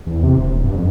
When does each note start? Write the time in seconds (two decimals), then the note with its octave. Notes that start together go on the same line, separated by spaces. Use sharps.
0.06 E2
0.23 C3
0.37 E1
0.52 D1
0.64 G2
0.76 F2